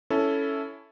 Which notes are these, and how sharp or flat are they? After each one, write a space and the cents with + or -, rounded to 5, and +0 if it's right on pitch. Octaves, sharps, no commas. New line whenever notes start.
C#4 +10 E4 +0 A4 +0